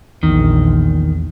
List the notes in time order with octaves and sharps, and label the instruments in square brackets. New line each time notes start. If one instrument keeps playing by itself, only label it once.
[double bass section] A#1 [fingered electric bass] E2 [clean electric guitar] D#3